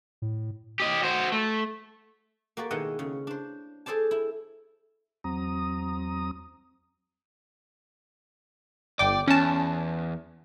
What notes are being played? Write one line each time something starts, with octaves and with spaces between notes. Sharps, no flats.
A2
G4 D#5
F#4 C5
A3
A#3 F#4 G4 D5
B2 D#3 G#3 E4 D#5 F#5
C#3
D4 C5
G#4 A4 C5 D5 A5
E4
E2 F#3 C4 A#5 D#6
G1 D5 G5 D6
E2 C#4 A5